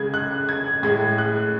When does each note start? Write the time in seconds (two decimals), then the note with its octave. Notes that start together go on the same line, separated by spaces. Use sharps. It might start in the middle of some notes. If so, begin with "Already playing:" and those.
Already playing: C#3 G#3 G#6
0.14 F#6
0.49 G#6
0.83 A2 G#3 G#6
1.18 F#6